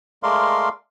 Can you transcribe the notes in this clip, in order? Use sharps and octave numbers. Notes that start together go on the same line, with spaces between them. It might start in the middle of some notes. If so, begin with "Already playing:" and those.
G#3 A3 A#4 D5 F5 C6